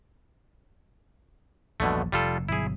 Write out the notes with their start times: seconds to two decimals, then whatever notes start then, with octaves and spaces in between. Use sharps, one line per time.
1.80 A#1 E2 G2 B2 D3 A3
2.12 F1 G3 F4 A4
2.49 G1 B2 F#3 E4 G#4